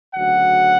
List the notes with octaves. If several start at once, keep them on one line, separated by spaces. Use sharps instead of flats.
D2 C#3 F#3 F#5